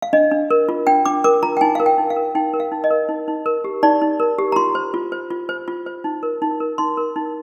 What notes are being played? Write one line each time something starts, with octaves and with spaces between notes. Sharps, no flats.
F5
D4 D#5
D4
A#4
F4
D4 G5
D4 D6
A#4 D6
F4 A#5
G5
D#4 G#5
A#4 F5
G5
D#4
F5
A#4
D#4 G5
A#4
F5
D#4
D#5
A#4
D#4
D#4
A#4
G4
D#4 D5
D#4
A#4
G4
A#5
F4 C6
C5
F4
C5
F4
C5
F4
C5
D#4
A#4
D#4
A#4
D#4 C6
A#4
D#4